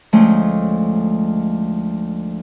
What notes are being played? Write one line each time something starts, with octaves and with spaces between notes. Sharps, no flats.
D2 F3 G#3 A3 C#4